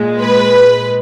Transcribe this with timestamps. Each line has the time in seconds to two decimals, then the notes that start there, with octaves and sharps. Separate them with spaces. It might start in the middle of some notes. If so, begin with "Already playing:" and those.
Already playing: A#2 G#3
0.20 B4